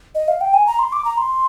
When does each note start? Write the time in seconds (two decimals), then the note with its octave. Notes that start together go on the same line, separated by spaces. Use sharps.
0.15 D#5
0.28 F5
0.41 G5
0.54 G#5
0.67 A#5
0.79 C6
0.93 D6
1.05 A#5
1.18 C6